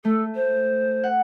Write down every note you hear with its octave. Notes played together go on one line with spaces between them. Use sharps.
A3 A4
C5
F#5